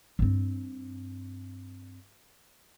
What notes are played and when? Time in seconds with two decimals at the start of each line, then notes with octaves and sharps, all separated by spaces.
0.19 G2 C4